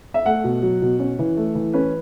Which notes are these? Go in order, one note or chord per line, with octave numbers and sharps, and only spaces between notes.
E5
A3 F#5
B2
F#3
B2
C#4
E3
A3
E3
C#4 B4